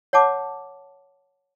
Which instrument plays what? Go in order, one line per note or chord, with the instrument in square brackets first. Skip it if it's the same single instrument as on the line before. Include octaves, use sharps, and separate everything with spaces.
[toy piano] C#5 F#5 A5 D6